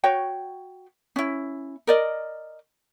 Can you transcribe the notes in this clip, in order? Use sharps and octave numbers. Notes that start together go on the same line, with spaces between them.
F#4 C#5 G5
C#4 E4
A#4 D5 D#5